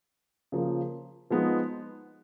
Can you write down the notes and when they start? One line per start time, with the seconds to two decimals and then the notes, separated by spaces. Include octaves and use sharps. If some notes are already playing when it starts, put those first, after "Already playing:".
0.52 C#3 F3 A#3
1.30 F3 G#3 B3 D#4